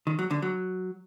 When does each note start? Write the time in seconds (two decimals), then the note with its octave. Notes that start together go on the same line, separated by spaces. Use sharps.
0.07 D#3
0.19 F#3
0.31 D3
0.42 F#3